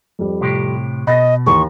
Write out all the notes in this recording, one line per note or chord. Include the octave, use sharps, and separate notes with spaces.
F2 G3
A2 C3 G4
B2 D#5 B5 A6 A#6
D#2 E3 C6 C#6